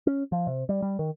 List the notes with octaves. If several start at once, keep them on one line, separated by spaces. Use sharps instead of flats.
C#4
F3
C3
G3
G3
D#3